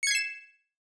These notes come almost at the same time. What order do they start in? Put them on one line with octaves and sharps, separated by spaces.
C#7 G#6 C7 E7